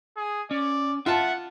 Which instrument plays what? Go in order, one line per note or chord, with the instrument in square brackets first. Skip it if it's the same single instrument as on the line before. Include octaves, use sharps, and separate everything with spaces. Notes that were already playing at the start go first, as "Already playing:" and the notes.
[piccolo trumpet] G#4
[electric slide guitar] C#4 [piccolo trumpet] D5
[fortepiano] F4 A5 [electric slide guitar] E5 [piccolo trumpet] F#5